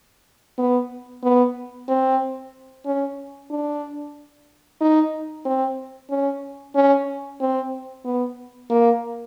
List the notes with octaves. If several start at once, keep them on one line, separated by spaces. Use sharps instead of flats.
B3
B3
C4
C#4
D4
D#4
C4
C#4
C#4
C4
B3
A#3